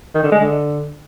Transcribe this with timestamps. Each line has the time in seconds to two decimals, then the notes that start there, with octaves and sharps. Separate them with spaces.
0.14 D#3
0.23 D3
0.32 G#3
0.40 D3